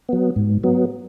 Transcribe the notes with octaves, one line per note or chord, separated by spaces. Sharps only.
F#3 B3
G#2
F#3 B3